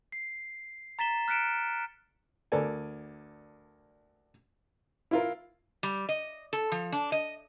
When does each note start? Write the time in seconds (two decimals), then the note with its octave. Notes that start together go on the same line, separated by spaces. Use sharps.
0.12 C7
0.99 A#5 A6 B6 E7 G7
1.28 F6 F#6 B6 C#7 D7 E7
2.52 D2 A4 A#4 D5 G#5
5.11 E4 F4 A#4
5.83 G3
6.09 D#5
6.53 A4
6.72 F3
6.92 D4
7.12 D#5